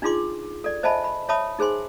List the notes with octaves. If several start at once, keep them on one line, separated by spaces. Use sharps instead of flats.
D4 D#4 F4 G#4 C6 D6
A4 D5
C5 D#5 E5 G#5 A5 B5
B5
C#5 E5 A5 B5 D#6
D#4 G#4 C5 G#5 C6